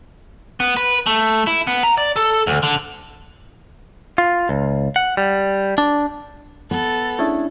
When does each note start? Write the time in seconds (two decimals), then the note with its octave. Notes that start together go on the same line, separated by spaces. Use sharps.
0.60 B3
0.77 B4
1.07 A3
1.47 E4
1.67 B3
1.83 A#5
1.98 D5
2.16 A4
2.47 D2
2.63 D3
4.18 F4
4.49 C#2
4.96 F#5
5.17 G3
5.78 D4
6.71 B3 A4
7.19 A3 C#4 D4 E4 G#4